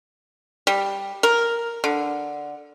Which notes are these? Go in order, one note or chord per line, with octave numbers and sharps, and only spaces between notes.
G3
A#4
D3